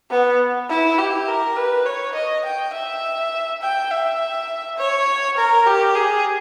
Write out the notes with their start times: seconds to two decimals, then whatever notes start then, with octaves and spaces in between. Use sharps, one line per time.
0.11 B3
0.70 E4
0.99 G4
1.28 A#4
1.57 B4
1.86 C#5
2.15 D#5
2.45 G5
2.73 E5
3.62 G5
3.91 E5
4.78 C#5
5.37 A#4
5.67 G4
5.96 G#4